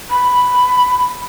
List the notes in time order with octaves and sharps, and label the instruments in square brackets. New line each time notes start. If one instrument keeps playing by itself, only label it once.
[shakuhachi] B5